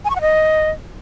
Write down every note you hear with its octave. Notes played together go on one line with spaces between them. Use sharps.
G#5
C#6
F#5
D#5